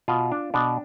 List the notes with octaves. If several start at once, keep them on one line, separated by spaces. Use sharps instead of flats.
B2 F4
D4
B2 D4